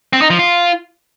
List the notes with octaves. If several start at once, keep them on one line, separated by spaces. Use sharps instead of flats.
C4
D#4
F3
F4